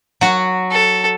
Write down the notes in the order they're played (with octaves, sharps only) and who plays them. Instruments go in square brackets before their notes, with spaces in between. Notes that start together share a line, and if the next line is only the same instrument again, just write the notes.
[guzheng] F#3 F#4
[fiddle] A4